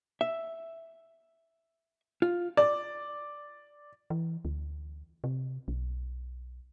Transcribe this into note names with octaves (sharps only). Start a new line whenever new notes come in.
E5
F4
D5
E3
D2
C3
B1